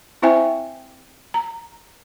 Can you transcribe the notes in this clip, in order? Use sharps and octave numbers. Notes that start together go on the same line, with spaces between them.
C4 E4 C5 E5 G5 G#5
A#5